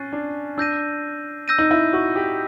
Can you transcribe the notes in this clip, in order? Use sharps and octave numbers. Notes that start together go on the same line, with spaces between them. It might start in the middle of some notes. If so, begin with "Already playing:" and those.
Already playing: C#4 F#6 A6 C7 D#7
D4
D4 E6 G6 A#6 D#7
E6 G6 A#6 D#7
D#4
E4
F#4
G4